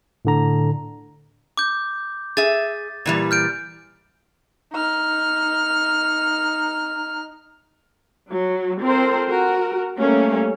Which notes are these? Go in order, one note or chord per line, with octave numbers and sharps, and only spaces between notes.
A2 D3 A#5
D6 G6
G#4 E5 A6
A#2 E3 G3
F6 G6 D7
D#4 F6
F#3
C4 F4 A4 A#4 C5
F#4 A#4
G3 A3 A#3 C#4